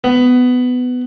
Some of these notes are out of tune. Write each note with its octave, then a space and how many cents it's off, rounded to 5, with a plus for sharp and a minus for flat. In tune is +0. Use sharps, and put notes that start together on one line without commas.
B3 +15